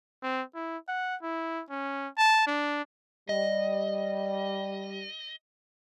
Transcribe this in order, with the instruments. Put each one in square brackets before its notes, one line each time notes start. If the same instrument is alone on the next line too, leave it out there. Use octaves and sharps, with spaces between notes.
[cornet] C4
E4
F#5
E4
C#4
A5
D4
[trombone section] G3 [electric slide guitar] D#5